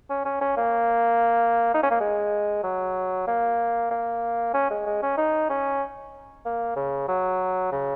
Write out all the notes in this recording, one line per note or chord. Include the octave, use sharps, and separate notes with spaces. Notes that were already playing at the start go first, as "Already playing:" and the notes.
C#4
C#4
C#4
A#3
D#4
C#4
A#3
G#3
F#3
A#3
A#3
C#4
G#3
G#3
C#4
D#4
C#4
A#3
C#3
F#3
C#3